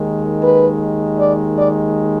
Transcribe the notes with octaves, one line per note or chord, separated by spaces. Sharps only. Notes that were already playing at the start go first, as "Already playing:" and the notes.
Already playing: D#2 D#3 G#3
B4
D5
D5